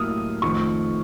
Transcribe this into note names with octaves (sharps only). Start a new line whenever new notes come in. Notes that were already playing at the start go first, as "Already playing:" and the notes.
Already playing: A2 F#3 A#3 D#6 F6
F2 D#3 A3 C#6